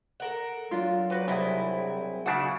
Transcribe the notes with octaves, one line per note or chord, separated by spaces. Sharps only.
A4 A#4 F#5
F#3 D4 F4
F#4 B4 C5 D5
C2 C4 E4 G#4
C#3 D4 E4 F#4 F#5 A5